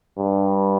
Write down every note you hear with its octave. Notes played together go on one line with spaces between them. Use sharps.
G2